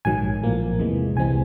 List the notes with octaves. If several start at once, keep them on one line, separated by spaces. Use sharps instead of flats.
A#1 G#2 D#3 F#3 G#5
A#1 A2 F3 A#3
E2 C3 E3 G#3
C2 C3 E3 G#3 C4 G#5